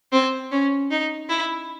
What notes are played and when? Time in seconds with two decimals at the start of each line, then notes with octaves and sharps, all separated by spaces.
0.12 C4
0.51 C#4
0.91 D#4
1.29 E4